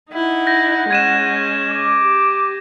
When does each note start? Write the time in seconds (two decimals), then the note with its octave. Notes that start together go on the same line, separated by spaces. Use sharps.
0.12 D#4 E4 F#5
0.47 G6 A#6
0.91 G#3 C#4 G#6 D#7 E7
1.68 D6
2.02 G4